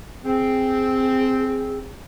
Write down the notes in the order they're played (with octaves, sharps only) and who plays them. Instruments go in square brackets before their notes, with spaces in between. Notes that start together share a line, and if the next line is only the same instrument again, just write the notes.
[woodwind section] C4 [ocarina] G#4